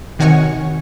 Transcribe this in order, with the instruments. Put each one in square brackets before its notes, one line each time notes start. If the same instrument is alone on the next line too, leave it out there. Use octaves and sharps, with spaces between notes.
[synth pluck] C3 D#3 F#4 C#5 G#5 C#6